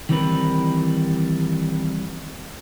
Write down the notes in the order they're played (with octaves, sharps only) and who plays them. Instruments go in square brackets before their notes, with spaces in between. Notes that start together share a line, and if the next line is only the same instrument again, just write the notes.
[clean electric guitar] D#3 E3 G3 C4 A#4 B4